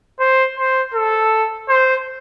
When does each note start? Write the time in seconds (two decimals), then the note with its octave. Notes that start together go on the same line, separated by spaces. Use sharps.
0.20 C5
0.57 C5
0.94 A4
1.69 C5